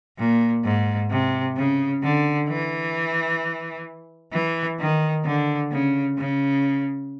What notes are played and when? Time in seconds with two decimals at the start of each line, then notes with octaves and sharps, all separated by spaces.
0.18 A#2
0.64 G#2
1.10 C3
1.57 C#3
2.02 D3
2.48 E3
4.32 E3
4.79 D#3
5.25 D3
5.71 C#3
6.17 C#3